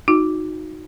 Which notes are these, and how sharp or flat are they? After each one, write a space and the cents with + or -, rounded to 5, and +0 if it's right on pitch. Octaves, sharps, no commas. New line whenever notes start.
D#4 +0 F#4 -25